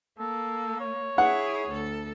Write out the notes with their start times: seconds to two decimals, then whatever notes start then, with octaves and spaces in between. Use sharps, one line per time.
0.19 A#3 A4
0.80 C#5
1.18 E4 G#4 F#5
1.69 D2 A4